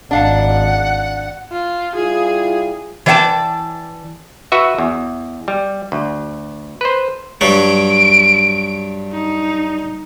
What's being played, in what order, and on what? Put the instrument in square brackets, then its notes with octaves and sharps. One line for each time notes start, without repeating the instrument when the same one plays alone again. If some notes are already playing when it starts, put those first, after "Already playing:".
[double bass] G#1 [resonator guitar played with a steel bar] D4 F5 A5 [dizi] F#5
[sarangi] F4
[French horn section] G3 E4 F4 [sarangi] G#4
[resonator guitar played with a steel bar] E3 C5 D5 F#5 G5 A5
[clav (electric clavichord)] F#4 B4 E5
E2
G3
D2
B4 C5
[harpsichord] G2 F#3 [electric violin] D7
[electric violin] D#4